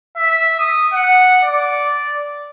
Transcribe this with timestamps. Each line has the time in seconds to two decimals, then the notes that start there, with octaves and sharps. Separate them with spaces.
0.17 E5
0.59 D#6
0.94 F#5
1.44 D5